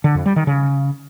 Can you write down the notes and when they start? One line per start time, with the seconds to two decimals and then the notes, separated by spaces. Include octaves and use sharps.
0.04 D3
0.15 F2
0.26 G3
0.36 D#3
0.47 C#3